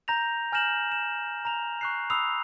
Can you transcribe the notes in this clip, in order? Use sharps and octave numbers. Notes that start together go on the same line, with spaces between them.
A#5 G6 A#6 F7
G#5 F6 G6 A#6 E7 F#7
E7
A#5 F7
C#6 F#6 C7
B5 D#6 E6 C7 F7